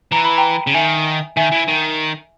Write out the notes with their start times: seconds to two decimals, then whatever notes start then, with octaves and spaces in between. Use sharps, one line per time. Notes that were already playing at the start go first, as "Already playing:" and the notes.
0.12 E3 A#5
0.25 B5
0.37 G5 A#5
0.67 C#3
0.74 D#3 E5 G#5
1.37 D#3 E5 G#5
1.52 E3
1.68 D#3